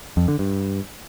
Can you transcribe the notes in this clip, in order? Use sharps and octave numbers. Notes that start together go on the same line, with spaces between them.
F2
D3
G2